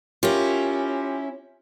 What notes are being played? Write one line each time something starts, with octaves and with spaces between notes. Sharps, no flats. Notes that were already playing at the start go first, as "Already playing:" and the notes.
C#4 E4 F4 G4 A#4